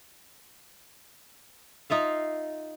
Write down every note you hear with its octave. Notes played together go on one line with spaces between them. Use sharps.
D#4 F4 E5 F5